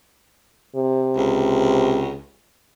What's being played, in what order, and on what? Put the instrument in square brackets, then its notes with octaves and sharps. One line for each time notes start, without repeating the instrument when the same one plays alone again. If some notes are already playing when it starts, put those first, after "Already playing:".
[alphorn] C3
[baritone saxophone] C#2